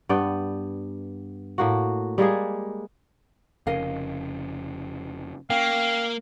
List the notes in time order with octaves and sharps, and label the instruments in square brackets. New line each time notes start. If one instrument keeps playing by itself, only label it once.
[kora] G2 B3 D5 G5
A2 A#3 F#4
G3 G#3 A#3 G#4
[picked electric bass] F1 C#3 [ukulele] A#4 D#5 F5
[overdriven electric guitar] A#3 [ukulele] C#4 G5 [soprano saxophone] F5